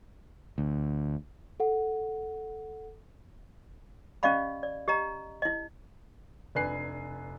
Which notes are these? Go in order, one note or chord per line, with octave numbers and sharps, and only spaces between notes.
D2
A4 F#5
C#4 G4 D5 D#5 F5 B5
D5
G4 D#5 A#5
E4 D#5
F1 D4 B4 G#5 F#6 C7